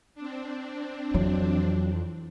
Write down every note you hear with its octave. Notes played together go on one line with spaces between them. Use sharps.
C4 D4
F2 E3 F#3